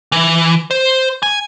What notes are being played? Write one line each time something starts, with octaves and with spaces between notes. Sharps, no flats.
E3
C5
G#5